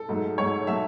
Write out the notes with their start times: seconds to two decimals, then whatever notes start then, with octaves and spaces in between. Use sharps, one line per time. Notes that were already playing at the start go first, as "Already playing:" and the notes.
Already playing: A4
0.09 G#2 F#3 A3
0.38 G#2 F#3 A3 C#5
0.67 F#3 A3 E5